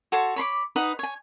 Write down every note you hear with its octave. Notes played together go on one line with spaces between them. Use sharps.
F#4 A4 C#5 C6
C#5 B5 C6 D6
D#4 B4 F#5 D#6
C#5 G#5